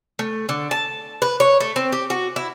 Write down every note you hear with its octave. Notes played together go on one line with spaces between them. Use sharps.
A3
D3
A5
B4
C#5
A3
C4
G4
F#4
E4